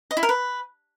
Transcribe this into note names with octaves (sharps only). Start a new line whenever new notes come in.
D#5
E4
A#4
B4